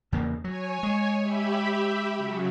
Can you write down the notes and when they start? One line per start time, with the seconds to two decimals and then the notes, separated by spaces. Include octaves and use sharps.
0.12 E2 C#3 A#3
0.44 F#3 C#5 G#5
0.83 G#3
1.21 G4 E5 B5
2.16 C#3 F#3